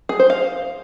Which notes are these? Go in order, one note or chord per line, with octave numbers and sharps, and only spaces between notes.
G#4
C5
F5